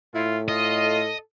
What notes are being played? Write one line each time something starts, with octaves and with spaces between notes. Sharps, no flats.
A2 E4 F4
F4 A4 D#5